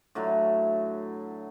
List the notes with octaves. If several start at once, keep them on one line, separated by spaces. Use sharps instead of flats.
A2 D3 F#3